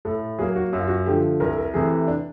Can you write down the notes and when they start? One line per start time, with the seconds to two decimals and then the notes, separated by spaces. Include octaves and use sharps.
0.05 A2 A4
0.39 F#3 G#4
0.41 A#3
0.56 F#4
0.73 F#2 F#4
0.80 F4
0.87 F#4
1.06 D3 F3 A3 G4
1.40 C2 A#4
1.49 A4
1.58 A#4
1.74 C3 E3 A3 G#4
2.07 D4